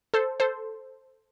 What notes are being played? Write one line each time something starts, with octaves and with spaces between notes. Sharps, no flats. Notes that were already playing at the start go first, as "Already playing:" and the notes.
A4 C5
A4 C5